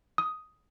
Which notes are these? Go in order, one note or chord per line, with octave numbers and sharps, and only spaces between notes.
D#6